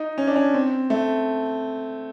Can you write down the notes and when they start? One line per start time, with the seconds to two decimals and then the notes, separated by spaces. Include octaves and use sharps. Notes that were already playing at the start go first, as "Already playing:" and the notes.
Already playing: D#4
0.18 C#4
0.28 D4
0.36 C#4
0.54 C4
0.90 A3